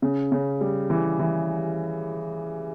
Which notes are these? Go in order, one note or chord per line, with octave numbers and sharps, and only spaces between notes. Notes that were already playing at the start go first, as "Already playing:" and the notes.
C#3
C#3
G3
E3
E3